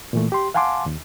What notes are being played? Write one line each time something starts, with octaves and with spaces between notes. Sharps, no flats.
A#2 E3 A3
G4 C6
F5 F#5 G#5 A5 C6 D6
D#2